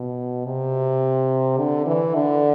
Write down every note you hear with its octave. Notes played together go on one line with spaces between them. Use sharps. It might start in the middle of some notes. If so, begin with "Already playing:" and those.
Already playing: B2
C3
D3
E3
D3